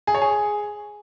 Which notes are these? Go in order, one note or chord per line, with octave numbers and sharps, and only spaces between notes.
G#4
C#5
G#4